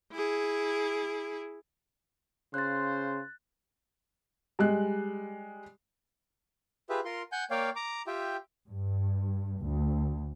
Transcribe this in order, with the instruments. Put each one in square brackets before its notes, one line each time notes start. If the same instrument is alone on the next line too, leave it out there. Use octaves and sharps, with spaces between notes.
[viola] E4 G#4
[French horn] C#3 [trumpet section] F4 C5 [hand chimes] F#6 A6
[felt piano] G3 G#3 F#6
[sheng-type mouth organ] F4 G4 G#4 B4 E5
F4 A#4 C6
F#5 G#5 G6
A#3 C#5 D5 F5 G5
A#5 D6
F4 G4 E5 G5
[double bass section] G2
D2